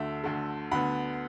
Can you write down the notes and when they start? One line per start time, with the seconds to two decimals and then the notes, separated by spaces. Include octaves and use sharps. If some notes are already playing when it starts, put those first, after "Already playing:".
Already playing: D2 D3 A3 E5
0.24 D2 D3 A3
0.71 D2 D3 B3 F#5 B5